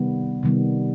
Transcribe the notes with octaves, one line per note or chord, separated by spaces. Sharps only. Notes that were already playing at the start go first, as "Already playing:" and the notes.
Already playing: C3 D#3 G3 B3
C3 D#3 G3 B3